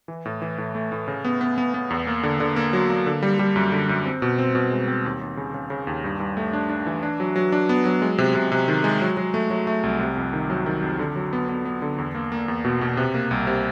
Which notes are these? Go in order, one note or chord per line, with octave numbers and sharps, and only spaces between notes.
E3
A2
E3
A2
A3
A2
C#3
B3
B3
B3
B3
E2
A#3
D3
D3
A#3
F#3
A#3
D3
G3
G3
F#2
D3
F#2
C4
B2
C4
B2
G#3
C4
D#2
D#2
C#3
C#3
C#3
D#2
G2
G2
A3
D4
D4
E3
D4
F#3
F#3
D4
B3
F#3
G#3
C3
C3
C3
D#3
G#3
F#3
F#3
A3
F#3
A3
C2
C3
F2
D#3
F#3
D#3
F2
D3
F#3
B3
B3
B3
D3
E2
A#3
A#3
E2
B2
B2
C3
A#3
C2
C3